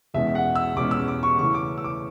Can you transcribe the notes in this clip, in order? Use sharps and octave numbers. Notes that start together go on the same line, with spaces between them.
E2 B2 G#3 C#4 E5
F#5
E6
E2 B2 G#3 C#4 D6
E6
D6
C#6
C#3 E3 A3 C#4 C#6
D6
E6
D6